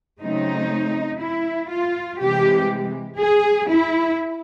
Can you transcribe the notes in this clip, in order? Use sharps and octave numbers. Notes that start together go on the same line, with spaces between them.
C#3 F#3 A3 C4 D#4
E4
F4
C3 E3 G#3 G4
G#4
E4